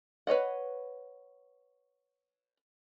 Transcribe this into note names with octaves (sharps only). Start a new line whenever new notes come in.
B4 C#5 D#5 F#5